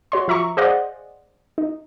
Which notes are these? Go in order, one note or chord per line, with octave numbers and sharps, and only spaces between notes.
F#4 C#5 C6
F3 E5 A#5 C#6
G#4 C5 D5 D#5 F5 F#5
D#4